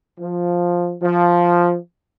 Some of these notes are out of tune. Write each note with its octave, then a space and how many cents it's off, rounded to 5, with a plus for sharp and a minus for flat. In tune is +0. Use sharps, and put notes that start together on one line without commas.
F3 +5
F3 +0